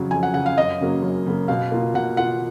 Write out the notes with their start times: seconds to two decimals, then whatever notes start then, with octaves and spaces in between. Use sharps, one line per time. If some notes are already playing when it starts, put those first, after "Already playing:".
Already playing: F2 C#3 F#3
0.11 F2 G#5
0.23 F#5
0.34 C#3 F#3 F#5
0.46 F5
0.57 F#2 D#5
0.81 C#3 F#3 A#3
1.02 F#2
1.26 C#3 F#3 A#3
1.48 B2 F5
1.72 A#3 F4
1.94 B2 F#5
2.17 A#3 F4 F#5